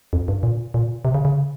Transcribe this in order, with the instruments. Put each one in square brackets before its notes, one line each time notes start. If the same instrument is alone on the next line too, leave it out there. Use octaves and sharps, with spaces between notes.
[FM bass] F2
G2
A#2
A#2
C3
C#3
C#3